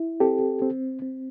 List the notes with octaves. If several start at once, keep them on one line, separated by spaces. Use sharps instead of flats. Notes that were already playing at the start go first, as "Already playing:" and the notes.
Already playing: E4
C4 G4 A4
C4
C4